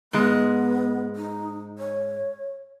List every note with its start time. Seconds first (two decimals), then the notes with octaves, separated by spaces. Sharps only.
0.13 G#2 G#3 B3
1.16 D#4
1.79 C#5